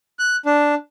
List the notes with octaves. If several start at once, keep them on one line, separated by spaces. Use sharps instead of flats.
F#6
D4